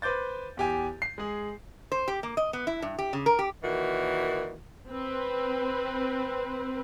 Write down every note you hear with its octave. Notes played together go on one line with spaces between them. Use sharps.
B4 C5 D6 G6 A6
E2 G4 G#5
C7
G#3 G#4
C5
G4
A#3
D#5
B3
E4
G2
G4
C#3
A#4
G4
A#2 D#3 E3 F#4
C4 B4